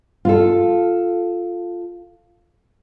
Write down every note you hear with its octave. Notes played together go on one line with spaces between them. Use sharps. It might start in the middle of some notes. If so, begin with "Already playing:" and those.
F4 A4